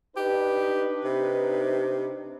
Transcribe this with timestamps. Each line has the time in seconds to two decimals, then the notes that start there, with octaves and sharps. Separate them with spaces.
0.17 D4 D#4 G4 B4
1.04 C3